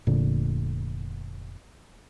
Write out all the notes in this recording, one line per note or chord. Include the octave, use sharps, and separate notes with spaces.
F1 A#2 D3